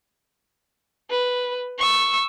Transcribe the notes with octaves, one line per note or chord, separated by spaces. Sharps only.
B4
C#6 E6